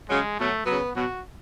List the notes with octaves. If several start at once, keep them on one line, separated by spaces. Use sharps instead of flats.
C#3 F#3 G#3
B2 F#3 A3
C#3 F#3 B3
B2 F#3 F#4